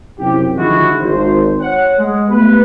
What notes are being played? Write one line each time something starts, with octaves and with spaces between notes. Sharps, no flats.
F#2 C3 E4 G4
D3 D#3 F3 G#3 E4 F#4
G#1 C5
C#5 F#5
G#3
A3 B3 G4 B4